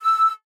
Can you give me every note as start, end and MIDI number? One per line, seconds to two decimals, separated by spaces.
0.01 0.32 88